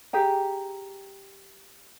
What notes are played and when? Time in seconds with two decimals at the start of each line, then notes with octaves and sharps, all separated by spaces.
0.13 G4 G#4 G5 A#5